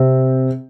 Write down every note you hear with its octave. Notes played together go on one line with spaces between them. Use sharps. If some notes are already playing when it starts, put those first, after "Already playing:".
Already playing: C3 C4